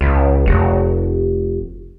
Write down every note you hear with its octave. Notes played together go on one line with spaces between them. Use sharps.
C#2
F1